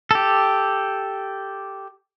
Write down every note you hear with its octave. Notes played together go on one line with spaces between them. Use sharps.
G4 A4